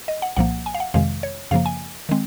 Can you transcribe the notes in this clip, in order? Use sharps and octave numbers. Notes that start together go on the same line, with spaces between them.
D#5
F#5
C2 A#2 F3 A#3 F#5
G#5
F5
F#5
F2 C3 D#3 G#3 F5
C#5
F#2 C#3 F3 A#3 F5
G#5
D#3 G#3 C4